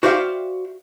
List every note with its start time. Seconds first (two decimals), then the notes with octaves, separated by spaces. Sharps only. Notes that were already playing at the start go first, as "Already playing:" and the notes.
0.03 F#4 C5 D5 E5 F5 G5